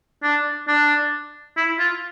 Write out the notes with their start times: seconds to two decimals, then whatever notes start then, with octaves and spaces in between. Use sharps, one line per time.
0.23 D4
0.68 D4
1.57 E4
1.79 F4